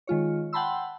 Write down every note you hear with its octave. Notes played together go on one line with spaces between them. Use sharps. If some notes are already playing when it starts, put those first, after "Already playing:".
D#3 G#3 F4 C#5
F#5 G5 A5 B5 C6 E6